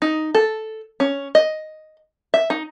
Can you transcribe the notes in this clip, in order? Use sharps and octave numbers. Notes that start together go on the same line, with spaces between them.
D#4
A4
C#4
D#5
E5
D#4